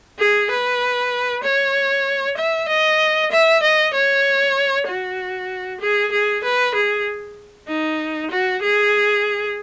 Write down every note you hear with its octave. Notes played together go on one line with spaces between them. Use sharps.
G#4
B4
C#5
E5
D#5
E5
D#5
C#5
F#4
G#4
G#4
B4
G#4
D#4
F#4
G#4